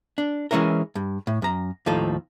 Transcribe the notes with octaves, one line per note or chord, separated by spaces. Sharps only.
D4
E3 G#3 C#4 E4 A#4
G2
A2
F#2 A#5
D#2 A2 F3 D#4 A4